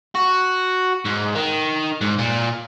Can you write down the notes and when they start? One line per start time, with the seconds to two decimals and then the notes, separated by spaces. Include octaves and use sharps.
0.15 F#4
1.05 G#2
1.35 D#3
2.01 G#2
2.19 A#2